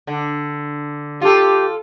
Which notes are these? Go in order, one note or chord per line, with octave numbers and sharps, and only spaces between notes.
D3
F4 G4 A4